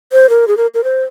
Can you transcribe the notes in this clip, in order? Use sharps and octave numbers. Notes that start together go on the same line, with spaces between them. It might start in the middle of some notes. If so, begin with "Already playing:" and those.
C5
A#4
G#4
A#4
A#4
C5